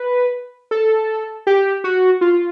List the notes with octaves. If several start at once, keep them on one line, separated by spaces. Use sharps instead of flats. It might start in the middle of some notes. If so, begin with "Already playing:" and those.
Already playing: B4
A4
G4
F#4
F4